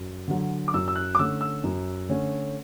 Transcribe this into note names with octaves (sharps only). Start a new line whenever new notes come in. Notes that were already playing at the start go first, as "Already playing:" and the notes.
Already playing: F#2
D3 F#3
D6
F#2 E6
E6
F#6
D6
D3 A3 C#4 E6
E6
F#2
D3 A3 C#4